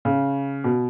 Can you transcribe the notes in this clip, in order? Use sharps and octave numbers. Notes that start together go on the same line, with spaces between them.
C#3
B2